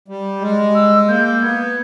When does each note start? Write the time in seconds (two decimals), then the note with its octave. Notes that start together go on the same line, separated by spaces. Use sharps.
0.08 G3
0.41 G#3
0.75 E6
1.08 A#3 G6
1.41 B3 G#6